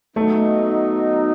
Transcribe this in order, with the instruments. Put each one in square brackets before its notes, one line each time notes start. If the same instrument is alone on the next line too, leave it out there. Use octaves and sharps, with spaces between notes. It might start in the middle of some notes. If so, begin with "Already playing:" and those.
[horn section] F#3 B3 D#4 [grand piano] A3